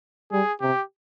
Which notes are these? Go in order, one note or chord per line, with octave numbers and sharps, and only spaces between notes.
G3 G#4
C3 G4